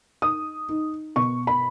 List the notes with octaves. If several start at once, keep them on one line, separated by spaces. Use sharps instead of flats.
D#4 D#6
D#4
B2 C#6
B5